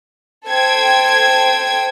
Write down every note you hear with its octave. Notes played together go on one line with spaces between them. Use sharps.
A4 C5 G5 G#6